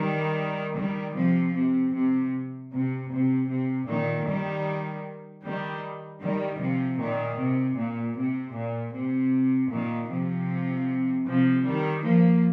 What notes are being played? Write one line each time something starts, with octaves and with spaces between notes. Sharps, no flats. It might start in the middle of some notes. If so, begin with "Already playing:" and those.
Already playing: D#3 G3
D#3 G3
C3 F3
C3
C3
C3
C3
C3
A#2 D#3
D#3 G3
D#3 G3
D#3 G3
C3 F3
A#2 D#3
C3
A#2
C3
A#2
C3
A#2 D#3
C3 F3
C3 F3
D#3 G3
F3 A#3